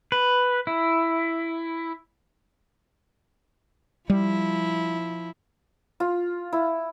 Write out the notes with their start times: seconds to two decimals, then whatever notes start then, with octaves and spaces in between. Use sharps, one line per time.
0.12 B4
0.67 E4
4.10 F3 G3 E4
6.00 F4
6.53 E4